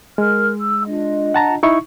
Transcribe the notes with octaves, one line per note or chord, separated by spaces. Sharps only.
G#3 A#4 F6
E6
D4 F4 D#5
F#5 A5 A#5
D#4 E4 C#6